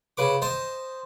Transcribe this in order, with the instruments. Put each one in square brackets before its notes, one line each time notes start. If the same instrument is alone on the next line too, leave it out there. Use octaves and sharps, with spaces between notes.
[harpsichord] C#3 B4 D6
C5 D#5 A5